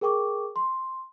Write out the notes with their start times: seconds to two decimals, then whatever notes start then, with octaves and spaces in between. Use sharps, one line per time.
0.01 G#4 A#4 G5 C#6 D6
0.56 C6